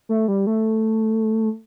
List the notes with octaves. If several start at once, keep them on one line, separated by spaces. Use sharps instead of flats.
A3
G3
A3